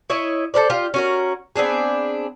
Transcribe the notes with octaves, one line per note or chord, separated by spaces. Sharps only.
E4 C#5 D#5 E5
A4 B4 C5 D5
F4 G4
C#4 F#4 A#4
B3 C4 D4 G#4